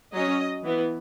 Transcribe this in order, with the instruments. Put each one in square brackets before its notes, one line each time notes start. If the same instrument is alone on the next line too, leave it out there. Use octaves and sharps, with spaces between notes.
[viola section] F#3 C#4 D#5
E3 B3